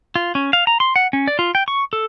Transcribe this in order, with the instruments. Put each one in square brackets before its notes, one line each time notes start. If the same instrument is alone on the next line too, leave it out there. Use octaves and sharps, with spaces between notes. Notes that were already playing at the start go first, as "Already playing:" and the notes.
[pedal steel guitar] F4
C#4
F5
A#5
C6
F#5
C#4
D5
F4
G5
C#6
A4